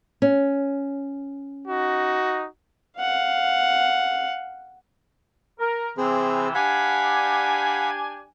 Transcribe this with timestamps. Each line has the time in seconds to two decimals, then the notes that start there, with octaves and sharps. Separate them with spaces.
0.22 C#4
1.67 D#4 F#4
2.98 F5 F#5
5.59 A#4
5.97 C3 E3 C4 G#4 C5
6.54 D4 G4 F5 F#5 G#5 B5